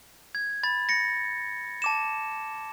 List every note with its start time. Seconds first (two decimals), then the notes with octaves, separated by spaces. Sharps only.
0.35 G#6
0.63 B5 A6
0.89 A#6 C#7
1.82 A5 D6 E7